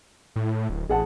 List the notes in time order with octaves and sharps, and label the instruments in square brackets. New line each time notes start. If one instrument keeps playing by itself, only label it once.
[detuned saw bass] A2
D1
[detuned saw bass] A1 [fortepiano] G#4 F#5 A5